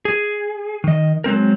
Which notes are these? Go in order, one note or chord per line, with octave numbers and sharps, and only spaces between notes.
G#4
D#3 D#5
F#3 G#3 C4 A#4